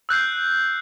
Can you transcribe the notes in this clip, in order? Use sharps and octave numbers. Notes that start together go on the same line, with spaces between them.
E6 F#6 G6 C7